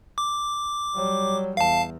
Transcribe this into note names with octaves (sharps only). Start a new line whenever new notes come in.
D6
F#3 G3
E2 F5 A5